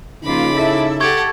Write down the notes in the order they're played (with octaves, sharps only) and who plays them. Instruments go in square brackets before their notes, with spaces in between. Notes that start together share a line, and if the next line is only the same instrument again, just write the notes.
[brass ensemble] C#3 D#4 [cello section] F3 A#3 F4 [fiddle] B5 D6
[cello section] E4 A4 E5
[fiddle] G4 F#5 [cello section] A4 [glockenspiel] C#6 G#6